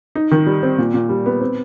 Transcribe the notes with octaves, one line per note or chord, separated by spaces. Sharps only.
D#4
D#3
G3
C4
A#2
A#2
G3
B3
C4